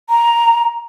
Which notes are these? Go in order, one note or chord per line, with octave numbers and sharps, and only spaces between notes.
A#5